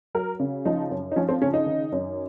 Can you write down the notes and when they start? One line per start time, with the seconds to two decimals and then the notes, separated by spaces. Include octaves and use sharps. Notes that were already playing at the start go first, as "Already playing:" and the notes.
0.15 F#3 A#4
0.40 C#3
0.65 F3 D#4
0.91 F#2
1.12 D#4
1.16 F3 C#4
1.29 C4
1.42 C#3 C#4
1.54 D#4
1.66 D#3
1.92 F#2